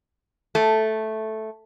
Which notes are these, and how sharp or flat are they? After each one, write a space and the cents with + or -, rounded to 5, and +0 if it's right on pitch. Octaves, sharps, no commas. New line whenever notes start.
A3 -5